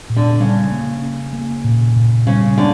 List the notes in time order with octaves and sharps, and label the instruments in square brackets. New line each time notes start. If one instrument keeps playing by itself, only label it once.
[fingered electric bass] A#2
[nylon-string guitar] D3
[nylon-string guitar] C#3 [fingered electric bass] G3
[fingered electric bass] A#3
C#4
A#3
A#2
A#2
[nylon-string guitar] C#3 [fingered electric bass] G3
[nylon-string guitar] D3 [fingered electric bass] A#3